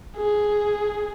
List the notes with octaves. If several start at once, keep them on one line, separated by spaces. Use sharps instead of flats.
G#4